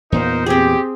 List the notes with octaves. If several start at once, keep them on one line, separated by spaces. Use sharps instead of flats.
E2 A#2 B3 D#4 A#4 C5
C4 G4 G#4